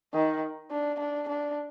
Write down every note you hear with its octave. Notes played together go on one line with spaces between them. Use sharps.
D#3
D4
D4
D4